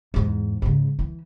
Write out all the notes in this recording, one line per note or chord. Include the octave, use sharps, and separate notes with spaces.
E2 G#2
G#2 C#3
E3